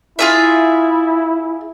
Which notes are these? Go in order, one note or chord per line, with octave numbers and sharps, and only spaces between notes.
E4 F4 G#4 E5